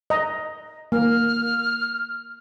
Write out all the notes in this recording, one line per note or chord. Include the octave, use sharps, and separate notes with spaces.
D#5 A#5
A#3 F6